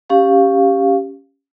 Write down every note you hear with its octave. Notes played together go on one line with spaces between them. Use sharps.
C#4 G4 F5